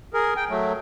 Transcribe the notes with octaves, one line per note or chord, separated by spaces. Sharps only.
G#4 A#4
G5
F#3 A3